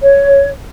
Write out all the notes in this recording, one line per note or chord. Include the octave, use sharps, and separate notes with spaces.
C#5